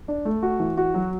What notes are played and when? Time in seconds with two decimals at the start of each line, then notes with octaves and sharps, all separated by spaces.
0.08 D4
0.25 A3
0.43 F#4
0.60 E3
0.77 F#4
0.94 F#3